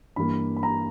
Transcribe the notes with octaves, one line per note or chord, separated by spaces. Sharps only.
G2 E3 G3 A#3 B5
B5
A#5